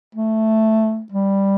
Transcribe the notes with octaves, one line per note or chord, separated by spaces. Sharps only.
A3
G3